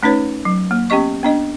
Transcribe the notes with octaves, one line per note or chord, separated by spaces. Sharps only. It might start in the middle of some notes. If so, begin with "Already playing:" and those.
A3 C#4 D#4 B4 C#5
F#3
A#3
B3 C#4 G4 D#5 C#6
B3 D4 D#5